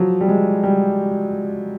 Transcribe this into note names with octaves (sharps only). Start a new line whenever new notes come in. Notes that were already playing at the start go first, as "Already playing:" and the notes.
Already playing: F3 F#3
G3
G#3
G3